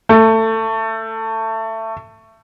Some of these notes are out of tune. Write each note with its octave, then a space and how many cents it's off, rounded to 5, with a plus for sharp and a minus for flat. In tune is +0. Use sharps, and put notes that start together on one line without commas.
A3 +20